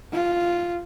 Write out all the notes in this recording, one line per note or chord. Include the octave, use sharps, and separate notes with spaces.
F4